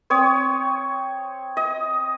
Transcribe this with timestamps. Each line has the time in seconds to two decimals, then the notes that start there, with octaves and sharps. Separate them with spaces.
0.10 C4 C#5 D#6
1.57 D#5